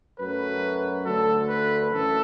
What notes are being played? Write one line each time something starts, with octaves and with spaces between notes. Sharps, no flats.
F#2 F#3 A3 B4
D2 D3 A3 A4
B4
F#2 E3 A3 A4